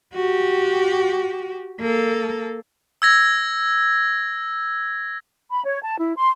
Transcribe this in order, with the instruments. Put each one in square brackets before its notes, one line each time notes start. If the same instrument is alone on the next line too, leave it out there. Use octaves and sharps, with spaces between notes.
[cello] F#4 G4
A#3 A4
[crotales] E6 G#6 A#6
[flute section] B5
C#5
A5
E4
C6